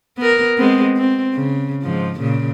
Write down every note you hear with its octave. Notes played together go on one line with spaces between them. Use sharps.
B3 A#4
G#3 B3 C4
C4
C#3
G#2 F3
A#2 C#3